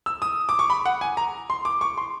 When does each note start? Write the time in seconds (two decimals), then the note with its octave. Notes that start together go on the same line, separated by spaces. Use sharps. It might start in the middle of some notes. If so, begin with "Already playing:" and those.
0.06 E6
0.22 D#6
0.49 D6
0.59 C#6
0.70 B5
0.86 F#5
1.01 G#5
1.17 A#5
1.50 C6
1.65 D6
1.81 C#6
1.98 C6